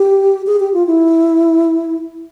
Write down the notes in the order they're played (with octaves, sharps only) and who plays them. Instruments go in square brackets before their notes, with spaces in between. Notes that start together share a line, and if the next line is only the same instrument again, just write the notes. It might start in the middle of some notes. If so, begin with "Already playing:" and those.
Already playing: [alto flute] G4
G#4
G4
F4
E4